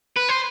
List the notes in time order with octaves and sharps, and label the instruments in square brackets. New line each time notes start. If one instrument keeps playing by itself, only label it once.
[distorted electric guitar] B4
C5